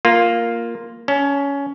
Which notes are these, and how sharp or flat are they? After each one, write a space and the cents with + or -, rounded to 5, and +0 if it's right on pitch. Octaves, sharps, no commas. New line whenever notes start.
A#3 +0 F4 +0
C#4 +15 A5 +0